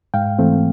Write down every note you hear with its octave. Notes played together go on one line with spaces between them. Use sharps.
G#2 F5 G5
E3 A3 C4